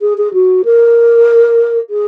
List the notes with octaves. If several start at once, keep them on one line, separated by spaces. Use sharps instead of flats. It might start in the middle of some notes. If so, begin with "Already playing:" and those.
G#4
G#4
F#4
A#4
G#4